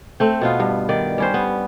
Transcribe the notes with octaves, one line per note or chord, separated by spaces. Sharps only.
A3 C4
B2 B3 F4
G2
D#3 D5
G3 C#4 C5
B3